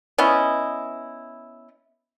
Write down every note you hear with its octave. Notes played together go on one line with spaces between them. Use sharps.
B3 C#4 E4 D#5